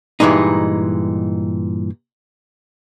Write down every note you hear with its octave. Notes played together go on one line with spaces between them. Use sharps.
G2 A#2 E3 G#3 D#4